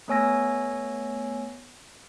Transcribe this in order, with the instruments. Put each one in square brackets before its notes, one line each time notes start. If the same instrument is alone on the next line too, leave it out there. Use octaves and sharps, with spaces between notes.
[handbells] A3 B3 C#5 G#5 E6 A#6